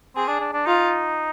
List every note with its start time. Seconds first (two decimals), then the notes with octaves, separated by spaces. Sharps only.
0.16 C4 G#4
0.28 D4
0.40 D4
0.53 D4
0.66 D#4 F4